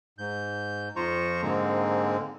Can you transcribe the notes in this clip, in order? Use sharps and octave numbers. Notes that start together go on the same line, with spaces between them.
G#2 G6
F2 F3 F4 C5 A#5 C#6
G#2 D3 G#3 A#3 C4